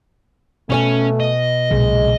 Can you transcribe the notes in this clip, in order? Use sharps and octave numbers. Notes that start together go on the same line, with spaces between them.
B2 A3 C#4 C#5 G#5
D#5
B1 A#2 C#3 G#3